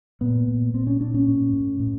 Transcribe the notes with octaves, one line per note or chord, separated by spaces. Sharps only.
A#2 B3
A#2
A#2 C4
C#4
A#2 D4
C#4
A2
A2
A2